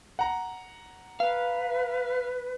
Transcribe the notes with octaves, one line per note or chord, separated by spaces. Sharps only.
F#5 A#5
B4 F5